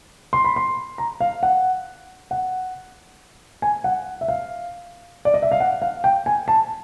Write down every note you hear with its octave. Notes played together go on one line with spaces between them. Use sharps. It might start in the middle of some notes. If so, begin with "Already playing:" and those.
C6
B5
C6
A#5
F5
F#5
F#5
G#5
F#5
E5
F5
D5
D#5
E5
F5
F#5
F5
G5
G#5
A5